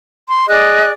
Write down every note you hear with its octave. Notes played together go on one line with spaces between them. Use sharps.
C6
G#4 D5 D#5 F#6